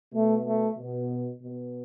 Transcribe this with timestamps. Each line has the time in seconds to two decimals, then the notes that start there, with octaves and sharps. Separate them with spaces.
0.13 B2 A3
0.45 A3
0.77 B2
1.42 B2